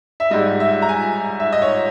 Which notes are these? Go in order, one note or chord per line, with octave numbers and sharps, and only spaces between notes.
E5
G#2 G3 D#5
E5
A#5
G#5
E5
D#5
C#5